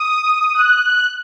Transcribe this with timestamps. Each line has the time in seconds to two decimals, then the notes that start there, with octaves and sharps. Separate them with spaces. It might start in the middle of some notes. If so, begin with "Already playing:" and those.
Already playing: D#6
0.54 F#6